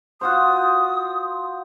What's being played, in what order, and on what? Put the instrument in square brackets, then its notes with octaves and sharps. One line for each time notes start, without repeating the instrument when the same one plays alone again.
[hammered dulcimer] F4 F#4 C5 [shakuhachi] D#6